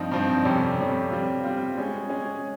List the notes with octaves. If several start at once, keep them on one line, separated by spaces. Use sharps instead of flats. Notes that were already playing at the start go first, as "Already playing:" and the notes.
Already playing: G2 F3 C4 D#4
G2 F3 C4 D#4
F2 C3 G3 C#4
F2 C3 G3 C#4
G3 C4 F4
G3 C4 F4
G#3 C#4 G#4
G#3 C#4 G#4